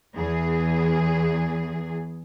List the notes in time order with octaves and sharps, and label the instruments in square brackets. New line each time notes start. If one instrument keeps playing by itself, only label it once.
[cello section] E2 G#4